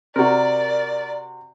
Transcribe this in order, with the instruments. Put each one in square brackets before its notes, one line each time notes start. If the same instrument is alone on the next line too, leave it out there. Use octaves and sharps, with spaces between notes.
[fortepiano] C3 F#4 [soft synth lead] A#4 [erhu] D5